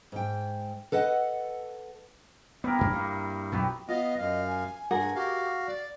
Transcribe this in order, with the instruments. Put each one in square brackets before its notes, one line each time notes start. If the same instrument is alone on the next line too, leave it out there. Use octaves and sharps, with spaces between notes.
[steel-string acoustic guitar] G#2 G5
A4 B4 D#5 F#5
[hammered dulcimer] G3 E4 A#4 [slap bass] B3
[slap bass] A1 F#2 D4
[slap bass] G2 [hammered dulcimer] A#3
[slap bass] B1 F#2 B2 [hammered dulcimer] F#3 B3 G4
[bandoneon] B3 D#5 [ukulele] F4 [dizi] F5
[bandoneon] F#2 F5 [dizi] D#5
[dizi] G#5
[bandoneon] G2 [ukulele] G#4 A#4 F#5 [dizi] G#5
[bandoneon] F#4 F5 [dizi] G4
[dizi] D5